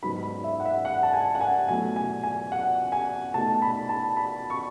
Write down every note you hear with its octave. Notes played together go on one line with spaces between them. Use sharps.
G#2 F#3 B3 D#4 B5
B5
E5
F#5
E5
F#5
A5
G#5
F#5
G#5
B2 F#3 A3 E4 G#5
G#5
G#5
F#5
G#5
B2 A3 D#4 A5
B5
A5
B5
C#6